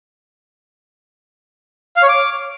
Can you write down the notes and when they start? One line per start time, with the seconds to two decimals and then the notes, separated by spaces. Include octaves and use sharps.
1.97 F5
2.03 C#5
2.09 D6